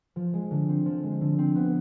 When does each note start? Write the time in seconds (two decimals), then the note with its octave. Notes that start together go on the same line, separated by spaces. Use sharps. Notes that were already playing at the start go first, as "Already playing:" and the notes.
0.16 F3
0.33 G#3
0.51 D3
0.69 C4
0.86 F3
1.04 G#3
1.21 D3
1.38 C4
1.56 B3